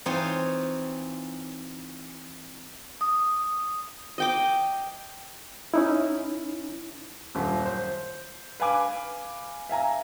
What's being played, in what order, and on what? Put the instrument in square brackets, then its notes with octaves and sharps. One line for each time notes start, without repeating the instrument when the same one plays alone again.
[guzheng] E3 C4 D#4 F4 C#5
[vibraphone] D#6
[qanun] D#5 G5 D6
[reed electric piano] C#4 D#4 E4
[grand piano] D#1 F#2
C5
B4 F5 G#5 D6
E5 F5 G#5 A#5